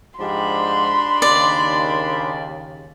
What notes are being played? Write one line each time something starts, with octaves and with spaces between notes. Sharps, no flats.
G#2 F3 D4 G4 B5 C6
D#2 C#3 D5